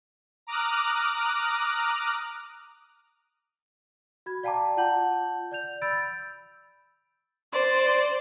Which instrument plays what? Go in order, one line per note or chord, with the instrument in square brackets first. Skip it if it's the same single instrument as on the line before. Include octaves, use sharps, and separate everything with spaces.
[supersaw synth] A#5 D6 D#6 F6 F#6
[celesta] F#4 B5 G#6
D5 F5 G5 A5 A#5 D6
F4 F#5 A5 G6 F#7
D5 G6 F7
B5 E6 G6 A6 D7
[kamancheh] C5 D5